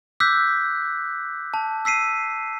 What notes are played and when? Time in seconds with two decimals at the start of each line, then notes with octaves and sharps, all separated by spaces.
0.20 D6 E6 F#6 G6 B6
1.54 A5
1.85 E6 B6 C7 D#7